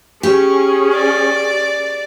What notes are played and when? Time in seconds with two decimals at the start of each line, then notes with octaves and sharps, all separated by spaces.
0.23 C#4 G4 G#4
0.95 D5